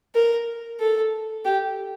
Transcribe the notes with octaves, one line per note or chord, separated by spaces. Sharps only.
A#4
A4
G4